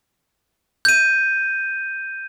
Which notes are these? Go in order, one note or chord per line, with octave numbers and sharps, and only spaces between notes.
G6 D#7